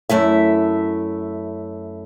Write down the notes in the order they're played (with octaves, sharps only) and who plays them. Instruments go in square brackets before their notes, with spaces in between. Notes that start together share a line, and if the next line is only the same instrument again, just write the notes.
[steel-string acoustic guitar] F#2 A3 E4 E5